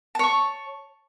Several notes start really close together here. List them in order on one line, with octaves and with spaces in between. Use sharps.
A5 C#5 C#6